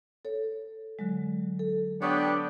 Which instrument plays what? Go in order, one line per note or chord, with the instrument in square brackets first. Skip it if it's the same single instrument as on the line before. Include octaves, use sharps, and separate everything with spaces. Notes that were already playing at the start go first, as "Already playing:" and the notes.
[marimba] A4 C#5
D3 F#3 G#3
A4
[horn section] B3 D4 G4 [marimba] C#5 C#6 D#6